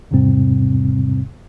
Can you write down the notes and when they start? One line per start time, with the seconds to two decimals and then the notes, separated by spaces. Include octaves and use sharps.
0.11 E2 G#2 C3 G3 C4